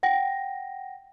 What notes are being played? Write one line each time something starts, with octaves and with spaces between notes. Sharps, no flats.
F#5 G5 A#6